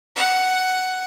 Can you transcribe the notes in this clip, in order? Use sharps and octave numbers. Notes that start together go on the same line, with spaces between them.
F#5